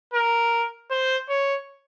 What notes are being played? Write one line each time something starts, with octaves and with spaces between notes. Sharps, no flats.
A#4
C5
C#5